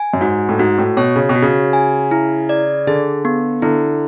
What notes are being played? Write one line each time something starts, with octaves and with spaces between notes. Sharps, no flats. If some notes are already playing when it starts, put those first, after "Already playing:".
Already playing: G#5
F#2
G#2 F#4
A2
G#2 F#4
A2
B2 C#5
C#3
B2
F#4
C#3
G#5
E4
D5
D3 G#4
B3
D3 E4